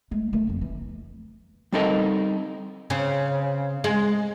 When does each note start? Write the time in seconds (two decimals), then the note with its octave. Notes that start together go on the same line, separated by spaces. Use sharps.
0.11 G#3 A3
0.33 D#3 A3
0.47 F2 F3
0.61 E3
1.73 G3 C4 D#4 A4 A#4 D#5
2.90 C#3 C4
3.84 G#3